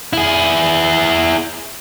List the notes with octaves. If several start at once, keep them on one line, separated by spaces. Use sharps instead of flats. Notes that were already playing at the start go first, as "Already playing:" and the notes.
E4 G#4